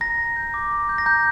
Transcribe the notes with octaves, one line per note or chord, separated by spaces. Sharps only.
A#5 A#6
A#5
G6
D6
A#5
G6
A#6
A#5 G6